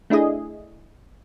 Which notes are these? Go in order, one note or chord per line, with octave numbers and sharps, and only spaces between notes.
A3 D4 E4 G#4 D#5